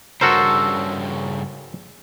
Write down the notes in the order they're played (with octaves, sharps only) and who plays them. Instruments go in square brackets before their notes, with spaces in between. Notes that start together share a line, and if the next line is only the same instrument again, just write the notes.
[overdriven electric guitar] G2 C#3 [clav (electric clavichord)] F#4 A#4 C5 [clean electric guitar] A4